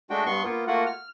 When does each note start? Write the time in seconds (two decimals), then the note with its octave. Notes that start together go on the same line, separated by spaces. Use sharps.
0.10 G#3 A3 D4 F#4 G5
0.26 G2 B3 C6 C#6
0.44 A#3 B3 F4
0.67 A3 A#3 F4 F#4 F#5
0.86 F6